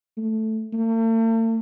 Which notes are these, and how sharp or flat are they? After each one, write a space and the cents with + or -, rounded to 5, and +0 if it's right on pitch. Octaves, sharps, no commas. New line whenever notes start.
A3 +0
A3 +45